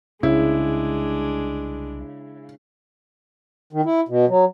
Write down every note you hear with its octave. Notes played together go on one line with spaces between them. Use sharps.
C2 C#3 G#3 D4 E4
D#3
E4
B2
F#3